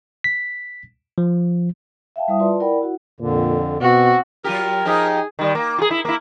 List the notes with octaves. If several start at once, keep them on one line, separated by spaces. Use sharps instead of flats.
B6
F3
E5 F5 G5 A5
G3 E4 C5 E5 D#6
F4 B4 D5 A5 C6
E4 A#4 D5 F#5 G5 B5
E4 F#4 F#5
F2 A#2 D3
B2 C4 F#4
F#3 F4 G4 A#4
F3 D#4 G4 G#4
D#3 G3
A#3
F4 G#4
E4
A#3 E4